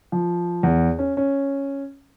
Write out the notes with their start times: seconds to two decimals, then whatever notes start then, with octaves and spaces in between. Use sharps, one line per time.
0.12 F3
0.63 E2
0.99 C#4
1.17 C#4